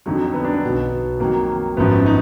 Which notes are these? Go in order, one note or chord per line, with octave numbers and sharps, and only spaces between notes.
F2 D3 F#3 D#4
B3
D4
B3
B1 B2 F#3
F2 D#3 F#3 A#3
G#1 F#2 F3 B3
D#4